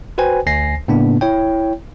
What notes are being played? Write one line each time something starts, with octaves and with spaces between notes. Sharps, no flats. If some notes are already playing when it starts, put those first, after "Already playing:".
F#4 B4 C5 G5 G#5
D2 G#5 A#6 C7
A2 C#3 A#3 B3 D4
E4 C#5 G5